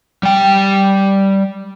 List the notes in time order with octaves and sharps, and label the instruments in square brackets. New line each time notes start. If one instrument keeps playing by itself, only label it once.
[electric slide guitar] G3 G5